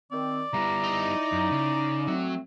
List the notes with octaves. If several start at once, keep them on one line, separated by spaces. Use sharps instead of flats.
D#3 C4 D5
G3 B3 E4 A#5
D#4
F#2
C#3
A2 F#3 A3 C4